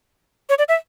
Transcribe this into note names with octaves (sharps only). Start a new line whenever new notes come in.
C#5
D5
E5